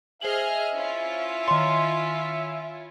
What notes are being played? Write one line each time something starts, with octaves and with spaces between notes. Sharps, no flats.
G#4 C5 D#5 E5 F6 F#7
C#4 E4 F4
D#3 C#5 C6